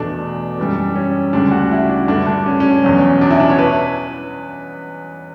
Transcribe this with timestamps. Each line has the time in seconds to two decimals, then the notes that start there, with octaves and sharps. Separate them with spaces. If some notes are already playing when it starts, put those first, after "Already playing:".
Already playing: E2 B2 A3 D4
0.58 F#2 E3 G3
0.95 C#4
1.33 D2 C#3 G3 D4
1.51 F#4
1.71 E4
1.90 D4
2.08 G2 D3 A3 D4
2.27 D4
2.46 C#4
2.60 C#4
2.84 E2 B2 F#3
3.21 D4
3.30 E4
3.40 D4
3.50 C#5
3.59 B4